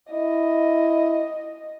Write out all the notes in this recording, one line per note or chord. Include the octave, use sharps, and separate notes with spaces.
E4 D#5